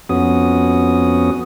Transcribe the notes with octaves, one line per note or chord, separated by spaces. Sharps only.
F2 B3 C#4 F#4 D#6